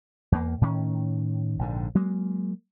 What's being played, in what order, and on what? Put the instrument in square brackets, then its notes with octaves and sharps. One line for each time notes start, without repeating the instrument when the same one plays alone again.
[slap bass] E2 A#3
A2 D#3 C#4
A#1 G#2 D3
F#3 G#3 A#3